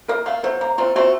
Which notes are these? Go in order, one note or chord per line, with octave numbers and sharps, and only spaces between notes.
A#3 A#4
A3 F5
F#3 C5
A#3 A#5
A3 C4 F4
A3 C4 F#4